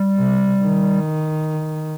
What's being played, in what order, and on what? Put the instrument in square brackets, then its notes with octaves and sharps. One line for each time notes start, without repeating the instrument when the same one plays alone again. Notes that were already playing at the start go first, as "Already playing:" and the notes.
Already playing: [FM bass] G3
[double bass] C3
D#3